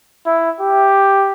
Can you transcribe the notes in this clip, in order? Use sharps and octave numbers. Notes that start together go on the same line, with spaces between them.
E4
G4